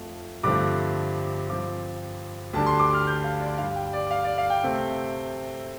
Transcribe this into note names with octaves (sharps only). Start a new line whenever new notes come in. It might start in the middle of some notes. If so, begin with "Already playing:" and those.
Already playing: F2 F3 A3
G2 D3 F3 A3 C4 D6
G2 F3 C4 D6
D2 D3 G3 D4 A5
C6
D6
F6
G6
F5
D5
G2 G3 D4 F5
G5
D5
F5
D5
F5
G5
C3 A3 C4